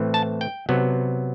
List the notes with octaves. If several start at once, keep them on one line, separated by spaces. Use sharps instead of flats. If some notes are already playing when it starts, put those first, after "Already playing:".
Already playing: A2 E3 A3 C4
A5
G5
C3 F#3 B3